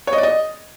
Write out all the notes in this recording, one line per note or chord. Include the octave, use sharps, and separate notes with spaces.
C#5
D#5
D5
D#5